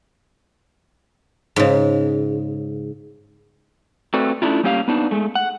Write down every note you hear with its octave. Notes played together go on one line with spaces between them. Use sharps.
G#2 C#3
A3 C4 F#4 B4 D5
A3 C#4 D4 E4 F4
G3 A#3 C#4 G4 C5 F5
B3 D4 D#4
G#3 A3
F#5